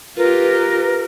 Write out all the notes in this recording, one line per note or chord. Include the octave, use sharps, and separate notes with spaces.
F4 G4 A#4 B4